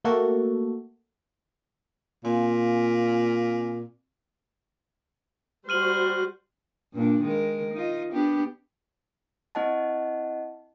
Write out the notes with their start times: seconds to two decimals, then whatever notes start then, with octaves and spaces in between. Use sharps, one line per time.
0.04 A3 A#3 F#4 A4
2.25 A#2 C4 F5 G#5
5.69 G3 F#4 C5 F6 D#7 F#7
6.94 G2 A#2 D4
7.22 D#3 G#3 A#4
7.74 D#4 F4 D#5
8.13 B3 D4 G4
9.55 C4 E4 D#5 F#5 A5